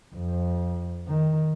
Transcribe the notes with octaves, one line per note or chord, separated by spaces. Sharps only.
F2
D#3